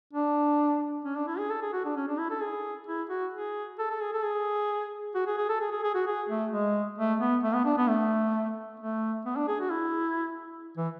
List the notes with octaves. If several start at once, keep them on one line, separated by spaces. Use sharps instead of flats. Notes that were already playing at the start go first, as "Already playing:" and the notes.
D4
C#4
D4
E4
G#4
A4
G#4
F#4
D4
C#4
D4
E4
A4
G#4
E4
F#4
G#4
A4
A4
G#4
A4
G#4
F#4
G#4
G#4
A4
G#4
G#4
G#4
F#4
G#4
A3
G#3
A3
B3
A3
B3
D4
B3
A3
A3
B3
D4
G#4
F#4
E4
E3